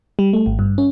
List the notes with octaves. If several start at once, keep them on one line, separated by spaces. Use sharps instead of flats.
G3
A3
G#1
G2
C#4